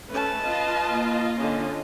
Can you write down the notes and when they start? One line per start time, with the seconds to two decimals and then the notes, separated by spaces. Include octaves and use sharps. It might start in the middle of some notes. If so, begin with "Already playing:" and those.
0.10 A3 C#4 B4 A5
0.47 F4 D#5
0.86 A#3
1.37 D3 C#4